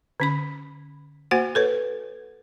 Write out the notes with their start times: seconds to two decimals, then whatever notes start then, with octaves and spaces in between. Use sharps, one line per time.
0.20 D3 C#4 B5
1.31 A#3 F#4 C5 F#5
1.55 A4 B4 C#5